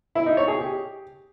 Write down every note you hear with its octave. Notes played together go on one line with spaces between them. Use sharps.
E4
D#4
C#5
G#4
G4